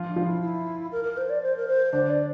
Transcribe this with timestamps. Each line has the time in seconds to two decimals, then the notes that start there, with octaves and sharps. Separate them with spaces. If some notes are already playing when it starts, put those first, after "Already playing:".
Already playing: F3 F4
0.08 D4
0.16 F3 F4
0.25 E4
0.41 E4
0.92 A#4
1.04 A#4
1.17 C5
1.30 D5
1.42 C5
1.57 A#4
1.68 C5
1.93 D3 D4 C5
2.10 D5